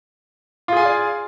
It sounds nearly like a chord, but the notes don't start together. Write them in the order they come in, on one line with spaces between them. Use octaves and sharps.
F4 G#4 G#5 F5 D5